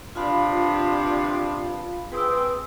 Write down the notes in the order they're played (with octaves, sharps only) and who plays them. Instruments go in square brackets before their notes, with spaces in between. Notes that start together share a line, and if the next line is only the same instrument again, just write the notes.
[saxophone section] C3 B3 D4 [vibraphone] F4 F5 B5
[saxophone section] C4 G#4 [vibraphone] B4 D#6 E6